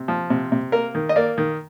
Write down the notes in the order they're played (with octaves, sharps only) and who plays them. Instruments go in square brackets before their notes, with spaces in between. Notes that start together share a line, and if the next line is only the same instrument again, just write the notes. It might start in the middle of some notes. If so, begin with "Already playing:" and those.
Already playing: [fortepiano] C3
F3
C3
C3
A#3 A#4
D#3
D#5
A#3 D5
D#3